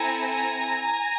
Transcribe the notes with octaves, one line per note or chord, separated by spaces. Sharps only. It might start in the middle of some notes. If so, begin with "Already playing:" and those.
Already playing: C4 E4 A4 G#5 A#5
G#5 A#5